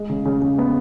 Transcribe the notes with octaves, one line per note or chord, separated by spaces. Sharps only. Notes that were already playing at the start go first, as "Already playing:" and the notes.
Already playing: G#3
C#3
C#3
C#3
B3